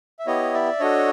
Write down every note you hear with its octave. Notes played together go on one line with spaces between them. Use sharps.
E5
B3 E4 G4 C#5 D#5
D5 E5
D4 F#4 A4 C#5 D#5